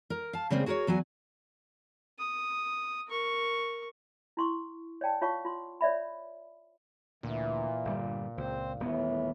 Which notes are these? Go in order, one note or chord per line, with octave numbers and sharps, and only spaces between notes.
A#4
F5 A5
C#3 G3 G#3 A#3 C4 G#4
F#4 G#4 A#4 B4 C#5
E2 F#3 F#4 G#5
D#6
A#4 C#6
E4 C6 C#6
C#5 D5 G5 A5
F4 C#5 F5 A5 C#6
F4 C6
C#5 D5 E5 B5
D2 A#2 E3
G1 D3 G3
C#2 C4 C5
D#1 A2 E3 B3